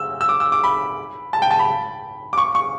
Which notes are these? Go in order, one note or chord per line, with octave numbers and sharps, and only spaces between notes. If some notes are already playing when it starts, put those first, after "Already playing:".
Already playing: E6
E6
D6
E6
D6
B5
A5
G5
A5
B5
D6
C#6
C#6